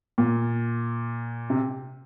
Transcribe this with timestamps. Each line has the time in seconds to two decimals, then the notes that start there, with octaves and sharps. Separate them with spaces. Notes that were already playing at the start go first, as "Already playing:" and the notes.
0.18 A#2
1.50 C3